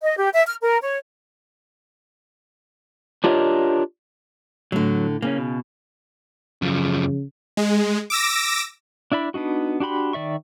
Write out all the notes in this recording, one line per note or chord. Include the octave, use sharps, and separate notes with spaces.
D#5
G4
E5
F6
A#4
C#5
D4 F4 G4 A#4 C#5 D#5
A2 D3 F#3
C#3 A#3 C4 C#4
B2
F#2 C#3 F3
G#3
D6 E6 A#6
D4 E4 D5 B5
B3 D4 D#4 F#4
D4 F#4 G4 B5 C6
D#3 D5 E5 C#6